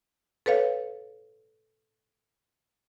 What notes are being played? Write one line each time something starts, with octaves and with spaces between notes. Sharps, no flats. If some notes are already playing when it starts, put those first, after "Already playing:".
A4 B4 C#5 F5